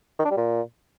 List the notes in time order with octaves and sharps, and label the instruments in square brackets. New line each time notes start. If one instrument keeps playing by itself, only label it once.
[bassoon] D#3
D4
G3
A#2